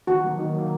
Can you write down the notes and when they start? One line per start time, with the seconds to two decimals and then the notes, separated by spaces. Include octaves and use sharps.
0.07 D#3 F#4
0.24 F#3 A#3
0.39 D#3
0.55 F#3 A#3